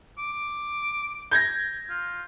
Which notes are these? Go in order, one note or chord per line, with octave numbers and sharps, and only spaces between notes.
D6
G6 G#6 A#6
F4